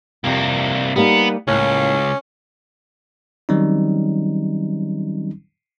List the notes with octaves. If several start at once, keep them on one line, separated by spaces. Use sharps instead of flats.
C2 F2 C3 A#3
G3 A#3 B3 D#4
C#2 A2 A#3 C#4
D#3 F#3 G3 C4 C#4 D#4